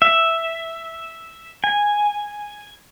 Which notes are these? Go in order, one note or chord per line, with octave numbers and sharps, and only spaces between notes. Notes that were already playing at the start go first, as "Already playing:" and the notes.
E5
G#5